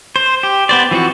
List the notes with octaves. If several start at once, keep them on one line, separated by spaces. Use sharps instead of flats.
C5
G4
B3 C5 D5
E3 F3 C4 F#4